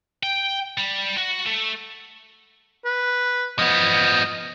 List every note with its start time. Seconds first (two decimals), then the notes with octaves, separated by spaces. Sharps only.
0.23 G5
0.78 G3
1.17 F#4
1.46 A3
2.85 B4
3.59 F3 B3 D#5